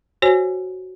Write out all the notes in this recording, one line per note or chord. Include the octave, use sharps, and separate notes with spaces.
F#4 C5 C#5 G#5